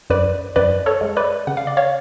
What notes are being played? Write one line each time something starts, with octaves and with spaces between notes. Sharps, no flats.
F#2 B4 D5
F#2 B4 D5
A4 C#5
G#3
B4 D5
C#3 F#5
F5
D5
C#5 F5